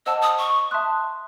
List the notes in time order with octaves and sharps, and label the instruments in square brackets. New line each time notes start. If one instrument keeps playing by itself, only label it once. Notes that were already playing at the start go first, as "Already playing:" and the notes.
[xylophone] C5 D#5 F#5 A5 D6 [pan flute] E6
[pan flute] D#6
C#6
[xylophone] E5 A5 C6 D#6 F#6